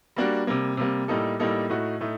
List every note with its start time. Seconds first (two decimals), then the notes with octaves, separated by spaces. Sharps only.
0.16 G3 A#3 D4 F#4
0.47 C3 G3 A#3
0.77 C3 G3 A#3
1.08 A2 G3 A#3 D#4 A4
1.39 A2 G3 A#3 D#4 A4
1.70 A2 A3 D#4 F#4
2.01 A2 A3 D#4